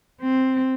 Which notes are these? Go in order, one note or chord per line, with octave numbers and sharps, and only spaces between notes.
C4